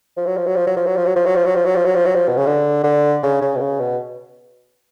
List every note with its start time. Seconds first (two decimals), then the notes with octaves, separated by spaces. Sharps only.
0.17 F3
0.26 F#3
0.37 F3
0.47 F#3
0.56 F3
0.67 F#3
0.77 F3
0.87 F#3
0.96 F3
1.06 F#3
1.16 F3
1.26 F#3
1.36 F3
1.45 F#3
1.55 F3
1.66 F#3
1.76 F3
1.85 F#3
1.95 F3
2.06 F#3
2.15 F3
2.28 B2
2.37 C#3
2.46 D3
2.84 D3
3.23 C#3
3.41 C#3
3.55 B2
3.61 C#3
3.80 B2